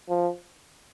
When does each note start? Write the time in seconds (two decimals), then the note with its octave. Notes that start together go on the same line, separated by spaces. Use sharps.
0.09 F3